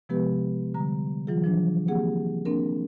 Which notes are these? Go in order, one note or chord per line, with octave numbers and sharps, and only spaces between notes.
C3 F3 G#3 B3 G4 B4
D3 G3 A#5
E3 F#3 F4 G#4
E3 F3 D4
A#3 C4 G4 G#4 F#5
A#3 C4 D4 A#4